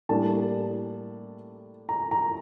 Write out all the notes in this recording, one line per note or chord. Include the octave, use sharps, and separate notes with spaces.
A2 G3 A#3 D4 A5
A#5
A#5